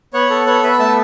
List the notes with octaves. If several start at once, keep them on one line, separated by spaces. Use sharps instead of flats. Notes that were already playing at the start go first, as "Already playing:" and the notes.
B3 C#5 F#5
A4
B3 C#5 F#5
B3 B4 E5
A3 E5 A5